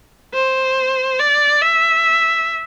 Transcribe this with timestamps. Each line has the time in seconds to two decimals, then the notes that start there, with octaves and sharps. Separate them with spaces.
0.34 C5
1.20 D5
1.62 E5